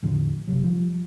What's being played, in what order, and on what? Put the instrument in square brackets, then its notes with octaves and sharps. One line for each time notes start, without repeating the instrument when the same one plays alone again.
[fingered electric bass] E2 A2 D3 F3
F#1 C3 F#3
F3 G3